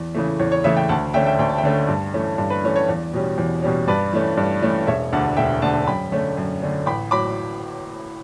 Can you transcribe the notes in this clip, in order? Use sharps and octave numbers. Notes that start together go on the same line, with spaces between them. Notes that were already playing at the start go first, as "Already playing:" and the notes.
Already playing: E2
C#3 E3 A3
E2 C#5
C#5
C#3 E3 A3 C#5 E5
E5 G5
D2 F#5 A5
D3 A3 C#4 E5 G5
E5 G5
D2 G5
A5
E5 G5
D3 A3 C#4
G2
E3 A3 C#4
G2
B4
E3 A3 C#4
C#5
E2
B2 G3 C#4
E2
B2 G3 C#4
G2 B4 D5
E3 A3 C#4
G2
E3 A3 C#4
E1 C#5 E5
D2 D3 D5 F#5
E1 E5 G5
D2 D3 F#5 A5
F#2 G5 B5
D3 A3 C#4
F#2
D3 A3 C#4
A1 G5 B5
A2 F#3 B5 D6